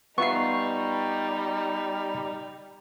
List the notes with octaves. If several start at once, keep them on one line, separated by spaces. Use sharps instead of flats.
G3 B3 D#4 F4 E5 C#6 C7